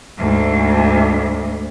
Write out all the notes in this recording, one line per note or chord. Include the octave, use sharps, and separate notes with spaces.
D2 G#2